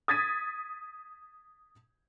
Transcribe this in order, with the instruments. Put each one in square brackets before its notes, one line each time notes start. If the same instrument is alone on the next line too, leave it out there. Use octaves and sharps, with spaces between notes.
[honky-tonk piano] D#6 G#6 A6 B6 D#7